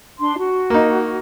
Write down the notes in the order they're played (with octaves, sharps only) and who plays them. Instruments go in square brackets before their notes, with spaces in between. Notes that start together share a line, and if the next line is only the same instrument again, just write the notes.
[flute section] D4 C6
F#4
[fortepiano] A#3 D#4